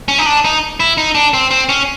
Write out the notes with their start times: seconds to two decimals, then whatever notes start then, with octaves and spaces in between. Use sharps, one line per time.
0.08 C#4
0.18 D#4
0.26 D4
0.45 D#4
0.80 E4
0.98 D#4
1.15 D4
1.34 C4
1.51 C4
1.69 C#4